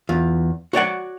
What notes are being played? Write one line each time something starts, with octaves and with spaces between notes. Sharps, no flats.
E2 F4
F#4 C#5 D5 F#5